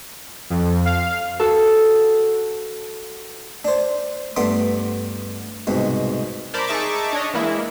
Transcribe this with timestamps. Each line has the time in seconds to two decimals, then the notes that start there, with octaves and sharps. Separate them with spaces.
0.50 F2
0.86 F5
1.39 F#4 A4
3.65 D4 C5
4.36 G2 A3 B3 C6 D6
5.67 C2 G#2 B2
6.54 A#4 C5 D5 A5 B5
6.67 D#4 G#4 E5 A5 C#6 D6
7.13 D4 C#5 D#5
7.34 E3 G#3 A#3 E4